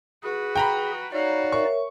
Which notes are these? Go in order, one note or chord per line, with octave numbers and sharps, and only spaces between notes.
F#4 G#4 B4
G5 A#5 B5
D#4 F#4 C#5 D5 F5
A#4 C#5 E5 C#6